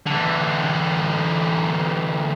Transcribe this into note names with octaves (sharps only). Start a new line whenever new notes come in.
D3 E3